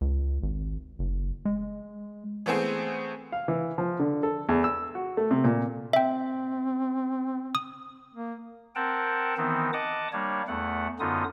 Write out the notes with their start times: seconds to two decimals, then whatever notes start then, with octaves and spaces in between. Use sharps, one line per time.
0.01 C#2
0.43 G#1
0.99 F#1
1.45 G#3
2.46 E3 A3 B3 C4 G#4
3.32 F5
3.48 E3
3.78 F3
4.00 D3
4.23 A4
4.49 E2
4.64 E6
4.95 F#4
5.17 A3
5.31 C3
5.44 A#2
5.93 C4 E5 G5
7.55 D#6
8.15 A#3
8.75 C4 A#4 F#5 G5 A5
9.37 D#3 E3 B3 C4 D#4
9.73 D#5 F#5 A5 D6 D#6
10.12 G3 A#3 D4 C#5
10.48 E2 A3 F#5
10.99 F#2 D3 B3 D#4 F4 D#6